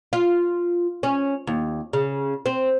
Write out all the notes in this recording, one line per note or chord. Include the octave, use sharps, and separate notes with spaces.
F4
C#4
D#2
C#3
C4